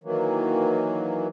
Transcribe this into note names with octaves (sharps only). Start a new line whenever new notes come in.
D#3 E3 F#3 A#3